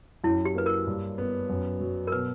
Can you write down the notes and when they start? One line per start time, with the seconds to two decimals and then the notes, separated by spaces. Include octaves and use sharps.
0.24 F#2 E4
0.45 G4
0.55 A#3 B4
0.66 A#4
0.87 G2
1.18 B3
1.50 F#2
1.80 F#3
2.07 A#4
2.12 B2 B4